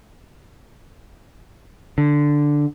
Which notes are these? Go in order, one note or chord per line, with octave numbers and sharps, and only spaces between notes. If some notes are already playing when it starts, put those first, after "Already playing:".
D3